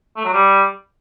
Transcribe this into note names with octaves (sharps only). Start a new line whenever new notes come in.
A3
F#3
G3